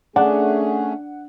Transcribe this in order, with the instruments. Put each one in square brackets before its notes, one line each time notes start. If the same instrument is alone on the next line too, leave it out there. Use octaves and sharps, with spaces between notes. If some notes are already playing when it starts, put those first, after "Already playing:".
[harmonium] A3 C#4 G#4 [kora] D4 [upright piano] F#5